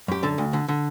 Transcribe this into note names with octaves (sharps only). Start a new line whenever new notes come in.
F#2 G4
D3 A4
D2
D3
D3